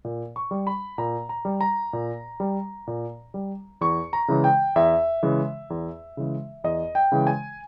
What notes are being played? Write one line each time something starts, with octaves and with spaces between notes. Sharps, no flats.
A#2
C#6
G3
B5
A#2 A#5
A#5
G3
A#5
A#2
G3
A#2
G3
E2 C#6
A#5
C#3 E3 G#3
G5
E2 E5
C#3 E3 G#3
E2
C#3 E3 G#3
E2 D#5
G5
C#3 E3 G#3
G#5